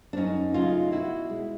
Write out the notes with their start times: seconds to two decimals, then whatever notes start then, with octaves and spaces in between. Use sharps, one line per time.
0.13 D4
0.17 F#2 C#4 D#4
0.54 C#3 F#3 A3 D#4 F4
0.92 B2 E4 F#4
1.30 G#3